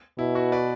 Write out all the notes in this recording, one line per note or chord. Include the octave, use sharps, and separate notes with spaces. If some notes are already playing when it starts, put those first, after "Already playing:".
B2 E4
F#4
B4 D5